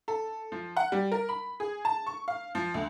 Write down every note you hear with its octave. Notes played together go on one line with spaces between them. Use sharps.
A4
F3
F#5
G3
A#4
B5
G#4
A5
C#6
F5
F3
D2